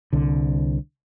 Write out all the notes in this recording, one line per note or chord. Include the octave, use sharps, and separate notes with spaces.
C2 D3